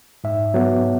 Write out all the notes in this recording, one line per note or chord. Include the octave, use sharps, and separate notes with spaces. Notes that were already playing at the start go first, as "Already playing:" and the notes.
G#2 E5
F#3 B3